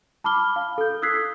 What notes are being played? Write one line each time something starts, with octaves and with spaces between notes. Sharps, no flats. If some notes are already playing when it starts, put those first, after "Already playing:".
A5 B5 D6 F6 G7
F5
A4 G6
D#6 E6 F#6 G#6 B6 C7